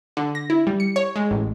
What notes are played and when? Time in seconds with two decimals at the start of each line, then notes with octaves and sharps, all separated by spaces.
0.17 D3
0.35 A#6
0.50 E4
0.67 G3
0.80 C#7
0.96 C#5
1.16 G#3
1.31 A1